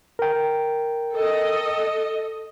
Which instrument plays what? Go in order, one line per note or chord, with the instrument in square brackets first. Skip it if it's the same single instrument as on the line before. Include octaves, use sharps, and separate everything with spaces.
[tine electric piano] A#4 G5
[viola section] A4 D#5